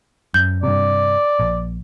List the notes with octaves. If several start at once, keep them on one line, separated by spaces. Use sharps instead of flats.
F#2 G6
G2 C3 D5
A#1